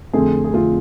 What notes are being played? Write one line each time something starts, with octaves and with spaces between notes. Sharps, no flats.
F2 D3 A3 C4 G#4
G#4
F2 D3 A3 C4 F4